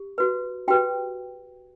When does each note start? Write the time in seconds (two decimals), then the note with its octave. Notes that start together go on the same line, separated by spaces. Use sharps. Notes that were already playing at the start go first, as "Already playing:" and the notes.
Already playing: G4
0.18 F#4 B4
0.68 F#4 G4 B4 G5